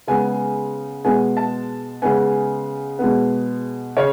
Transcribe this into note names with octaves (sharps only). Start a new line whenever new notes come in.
C#3 G#3 B3 G#5
B2 G#3 B3 G#5
A5
C#3 G#3 B3 G#5
B2 G#3 B3
C#3 C#5